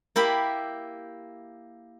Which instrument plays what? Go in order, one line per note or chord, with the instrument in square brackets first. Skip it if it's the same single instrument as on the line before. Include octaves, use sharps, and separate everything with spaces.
[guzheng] A#3 E4 G4 B5